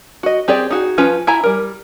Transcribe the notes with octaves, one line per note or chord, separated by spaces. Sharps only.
F#4 D#5
C4 G4 G#4 D5
D#4 F#4 G#4
F3 C#4 F4 B4
E4 E5 G#5 A#5
G3 A#4